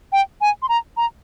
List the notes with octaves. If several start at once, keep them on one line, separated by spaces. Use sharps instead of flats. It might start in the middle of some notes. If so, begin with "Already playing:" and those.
G5
G#5
C6
A#5
A#5